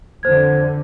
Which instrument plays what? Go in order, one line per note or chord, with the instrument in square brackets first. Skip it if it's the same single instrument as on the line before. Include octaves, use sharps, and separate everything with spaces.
[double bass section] F2 D3 [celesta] C5 G#6